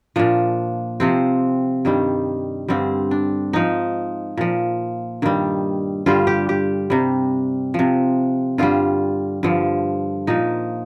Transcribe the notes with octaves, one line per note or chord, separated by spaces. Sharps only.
A#2 F3 D4
C3 F3 C4
G2 D#3 G3
G2 D3 G3 C4
D4
G#2 F3 D#4
A#2 F3
G2 D#3 G3
G2 D3 G3 F4
G4
G4
C3 G3
C3 F3
G2 D3 G3 F4
G2 D3 F3
A#2 F3 D#4